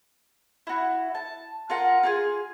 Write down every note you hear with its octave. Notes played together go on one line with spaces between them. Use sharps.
E4 F#4
A5
F4 A#4 F#5
F4 G4 G#4